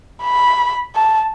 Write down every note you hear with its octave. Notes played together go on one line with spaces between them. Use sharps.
B5
A5